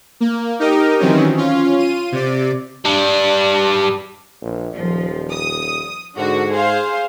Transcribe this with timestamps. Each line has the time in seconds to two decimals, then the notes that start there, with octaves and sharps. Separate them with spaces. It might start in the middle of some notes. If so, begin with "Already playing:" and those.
0.21 A#3
0.59 D#4 G4 A#4 D#5
0.99 D#3 E3 F#3 C4 C#4 D#4
1.37 C#4 F4
1.78 F4 D#7
2.12 C3 D5
2.85 G3 D4
4.42 A#1
4.76 D#1 F3
5.31 D#6
6.17 G#2 D3 F#4
6.53 G#4 C5 F5